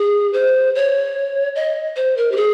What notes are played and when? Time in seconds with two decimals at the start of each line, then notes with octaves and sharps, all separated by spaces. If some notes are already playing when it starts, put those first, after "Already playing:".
Already playing: G#4
0.33 C5
0.75 C#5
1.55 D#5
1.96 C5
2.17 A#4
2.32 G4
2.37 G#4